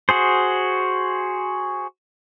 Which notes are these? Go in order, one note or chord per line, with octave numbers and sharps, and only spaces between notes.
F#4 G#4 C5